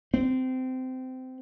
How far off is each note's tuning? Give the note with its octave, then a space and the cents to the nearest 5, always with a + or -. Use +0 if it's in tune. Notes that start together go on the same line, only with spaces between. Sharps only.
C4 -20